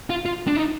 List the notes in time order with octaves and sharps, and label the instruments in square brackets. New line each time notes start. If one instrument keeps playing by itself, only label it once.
[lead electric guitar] F4
F4
D4
D#4